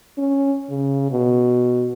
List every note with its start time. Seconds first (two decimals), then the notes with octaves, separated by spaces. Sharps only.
0.18 C#4
0.70 C#3
1.11 B2